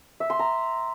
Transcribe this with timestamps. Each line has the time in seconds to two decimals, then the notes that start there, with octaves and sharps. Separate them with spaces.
0.20 E5
0.30 C6
0.39 A#5